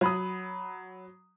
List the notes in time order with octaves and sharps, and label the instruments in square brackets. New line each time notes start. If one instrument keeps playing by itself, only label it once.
[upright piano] F#3 B5 D#6